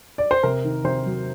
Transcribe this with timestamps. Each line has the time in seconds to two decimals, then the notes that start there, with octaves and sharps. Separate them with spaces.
0.18 D5
0.31 C5
0.43 C3 A#4
0.64 D#3
0.84 C3 C5
1.05 F#3